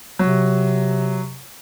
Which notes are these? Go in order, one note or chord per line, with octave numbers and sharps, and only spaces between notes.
C3 F#3